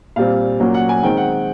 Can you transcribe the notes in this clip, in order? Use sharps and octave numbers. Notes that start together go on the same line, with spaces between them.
A#2 G3 C4 F5
A#2 F#3 A#3 C#4
F#5
G#5
D#3 G#3 C4 G5
F#5